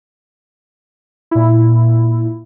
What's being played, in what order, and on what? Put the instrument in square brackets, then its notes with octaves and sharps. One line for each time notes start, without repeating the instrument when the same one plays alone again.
[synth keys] A#2 E4